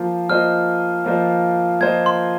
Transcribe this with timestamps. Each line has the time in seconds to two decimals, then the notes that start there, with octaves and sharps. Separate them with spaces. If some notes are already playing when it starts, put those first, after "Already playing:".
Already playing: F3 A#3 F4 C5
0.29 F3 A#3 F4 C5 D#5 F6
1.04 F3 A#3 F4 C5 D#5
1.80 F3 A#3 F4 C5 D#5 G#6
2.06 C6